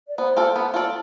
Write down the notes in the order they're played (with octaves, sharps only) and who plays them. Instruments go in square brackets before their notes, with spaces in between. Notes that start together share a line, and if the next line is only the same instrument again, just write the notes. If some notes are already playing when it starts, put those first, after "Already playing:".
[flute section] D5
[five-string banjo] B3 [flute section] C5
[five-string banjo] F4 A4 D5
B3
F4 A4 D5